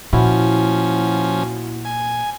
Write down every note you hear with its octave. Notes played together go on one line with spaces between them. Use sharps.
A#2 F3 C#4 E4 F#4 F#5
G#5